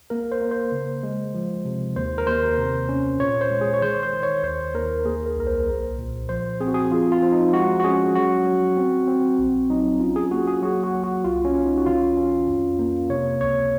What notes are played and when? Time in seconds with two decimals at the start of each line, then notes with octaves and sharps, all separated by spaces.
0.10 A#3 A#4
0.32 C5
0.41 A#3
0.51 C5
0.72 C#3
1.03 G#3
1.34 F3
1.65 C3
1.96 D#2 C5
2.18 A#4
2.27 D#2 C5
2.58 C3
2.89 C#4
3.19 A#2 C#5
3.41 C5
3.51 G#3
3.61 G#4
3.74 C#5
3.81 D#3 C5
4.03 C5
4.13 D#3
4.23 C#5
4.44 D#2 C5
4.74 D#2 A#4
5.05 A#3 G#4
5.26 A#4
5.37 C2 A#4
5.47 C5
5.67 A#1
5.98 A#2
6.29 F3 C5
6.61 C4 G#4
6.67 F#4
6.74 G#4
6.91 F3 F4
7.12 F4
7.22 F3
7.32 D#4
7.53 G#3 F#4
7.80 F#4
7.84 C#4 G#4
8.15 F#3 F#4
8.46 F#3
8.77 C4
9.07 C4
9.39 A#1
9.69 F#3 D#4
10.00 C#4 F4
10.16 G#4
10.31 A#3 F#4
10.47 G#4
10.62 F#3 F#4
10.83 F#4
10.94 F#3
11.04 F#4
11.24 C2 F4
11.45 C#4
11.55 C#4
11.66 D#4
11.78 F#4
11.86 D#3 F4
12.17 C#4
12.48 F2
12.79 A#3
13.10 C3 C#5
13.41 C#2 C#5